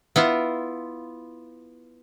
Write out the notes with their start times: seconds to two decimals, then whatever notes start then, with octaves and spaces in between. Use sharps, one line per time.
0.16 B3 E4 F4